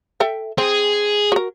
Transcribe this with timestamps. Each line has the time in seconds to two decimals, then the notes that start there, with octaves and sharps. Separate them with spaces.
0.20 A4 E5 G5
0.58 C4 G#4
1.32 F#4 A#4